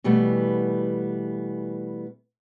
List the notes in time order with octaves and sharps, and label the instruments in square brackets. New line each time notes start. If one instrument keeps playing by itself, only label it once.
[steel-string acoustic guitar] B2 E3 G3 A3 B3